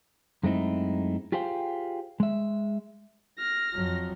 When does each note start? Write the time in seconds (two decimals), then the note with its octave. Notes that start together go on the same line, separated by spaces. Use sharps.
0.43 F#2 G#3 A3 C4 D#4 E4
1.32 F4 G4 G#4 C5 F5 G5
2.20 G#3 E5
3.38 F6 A#6
3.74 F2 F#3